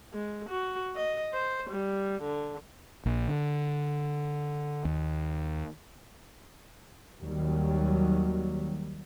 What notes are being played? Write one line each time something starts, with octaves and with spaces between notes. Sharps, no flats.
G#3
F#4
D#5
C5
G3
D3
A#1
D3
D#2
D#2 D#3 F#3 G3